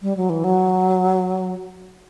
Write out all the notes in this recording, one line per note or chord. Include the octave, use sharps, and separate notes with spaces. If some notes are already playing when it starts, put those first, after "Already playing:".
G3
F#3
E3
F#3